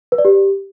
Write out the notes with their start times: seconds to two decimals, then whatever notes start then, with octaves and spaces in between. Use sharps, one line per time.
0.12 B4
0.18 D5
0.25 G4